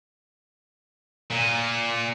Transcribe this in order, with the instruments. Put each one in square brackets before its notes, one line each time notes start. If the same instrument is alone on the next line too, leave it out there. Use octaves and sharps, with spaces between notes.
[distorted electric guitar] A#2